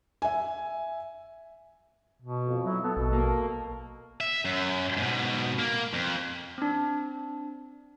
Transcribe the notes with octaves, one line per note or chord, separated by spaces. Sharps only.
E5 G#5
B2
F2
F#3 E4
B3 A4
A#1 B2
A#3
E5
F#2
G#2 B2
A#3
F2
C4 D4